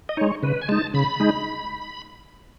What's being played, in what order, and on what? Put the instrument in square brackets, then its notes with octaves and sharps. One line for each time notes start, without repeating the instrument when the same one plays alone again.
[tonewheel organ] D#5
G#3 D#4 C#5
C#3 B4
G#5
G#3 D#4 A5
C#3 B5
G#3 D#4